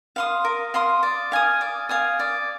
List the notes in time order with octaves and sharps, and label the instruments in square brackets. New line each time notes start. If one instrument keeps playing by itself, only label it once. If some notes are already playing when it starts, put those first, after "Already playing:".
[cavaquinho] F5 C6 D#6
A#4
F5 C6 D#6
D5
F5 G#5 D#6
D5
F5 G#5 D#6
D5